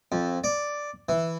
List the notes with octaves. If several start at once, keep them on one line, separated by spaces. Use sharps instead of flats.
F2
D5
E3